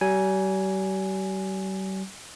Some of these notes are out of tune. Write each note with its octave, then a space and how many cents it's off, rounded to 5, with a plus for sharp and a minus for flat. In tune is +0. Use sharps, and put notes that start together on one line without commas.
G3 -40 G#5 +0